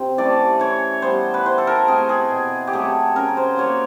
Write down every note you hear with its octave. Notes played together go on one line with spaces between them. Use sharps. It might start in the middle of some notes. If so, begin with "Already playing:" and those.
Already playing: C3 C4
E3 A3 C#4 D5
E3 C#5
G3 B3 C5
B4
E3 C5
A4
A#4
A3 C4 G#4
G#4
B2
G4
F#3 A3 C4 G#4
C#3 A#4
C5
F#3 A#3 C#5